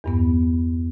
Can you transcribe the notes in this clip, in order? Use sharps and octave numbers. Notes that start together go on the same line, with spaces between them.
E2 G2 B3